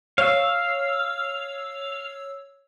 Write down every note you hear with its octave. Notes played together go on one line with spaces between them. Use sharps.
C#5 F5 E6